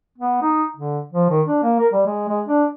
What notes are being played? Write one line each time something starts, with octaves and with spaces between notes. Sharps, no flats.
B3
D#4
D3
F3
D#3
D4
A#3
A#4
G3
G#3
G#3
D4